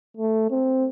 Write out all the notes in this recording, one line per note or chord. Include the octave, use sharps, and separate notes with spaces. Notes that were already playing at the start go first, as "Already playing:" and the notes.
A3
C4